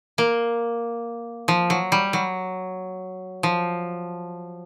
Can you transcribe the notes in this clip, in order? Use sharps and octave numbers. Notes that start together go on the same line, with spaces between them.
A#3
F3
F#3
G3
F#3
F3